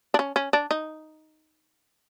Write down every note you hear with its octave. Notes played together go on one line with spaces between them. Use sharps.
D4
C#4
C#4
D4
D#4